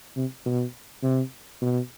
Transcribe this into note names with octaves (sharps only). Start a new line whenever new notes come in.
C3
B2
C3
B2